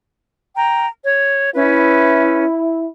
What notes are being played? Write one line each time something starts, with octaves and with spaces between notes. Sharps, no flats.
G5 A#5
C#5
C#4 E4 B4